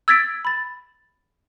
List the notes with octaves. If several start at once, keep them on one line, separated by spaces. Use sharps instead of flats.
E6 G#6 A6 B6 D7
B5 A6